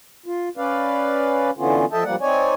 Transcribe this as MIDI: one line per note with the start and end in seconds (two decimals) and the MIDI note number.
0.26 0.49 65
0.57 1.50 61
0.57 1.50 71
0.57 1.50 74
0.57 1.50 77
1.57 1.85 50
1.57 1.85 52
1.57 1.85 59
1.57 1.85 61
1.57 1.85 65
1.92 2.04 53
1.92 2.04 69
1.92 2.04 75
1.92 2.04 76
1.92 2.04 79
1.92 2.04 81
2.04 2.16 43
2.04 2.16 53
2.04 2.16 55
2.04 2.16 58
2.04 2.16 74
2.04 2.16 78
2.21 2.54 60
2.21 2.54 63
2.21 2.54 73
2.21 2.54 74
2.21 2.54 80